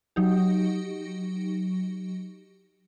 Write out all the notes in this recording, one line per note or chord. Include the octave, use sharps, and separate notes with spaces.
F#3 D#4 G4